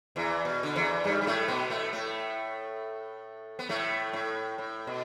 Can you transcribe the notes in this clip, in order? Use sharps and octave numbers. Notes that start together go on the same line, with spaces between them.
E2 E3
B2
D3
E2 E3
G2 G3
G3
A2 A3
B2 B3
A2 A3
A2 A3
B3
A2 A3
A2
A2
B2